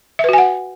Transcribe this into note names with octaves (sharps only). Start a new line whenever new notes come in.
F#4 B4 E5 F#5 G#5